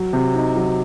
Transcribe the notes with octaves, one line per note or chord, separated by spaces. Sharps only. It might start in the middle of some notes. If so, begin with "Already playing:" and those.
Already playing: F#3
C3
D#4
F#3